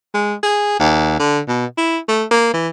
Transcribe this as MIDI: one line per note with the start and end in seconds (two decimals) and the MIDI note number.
0.14 0.34 56
0.43 0.76 68
0.79 1.18 39
1.19 1.40 50
1.48 1.66 47
1.78 1.98 64
2.08 2.24 57
2.31 2.51 58
2.54 2.69 52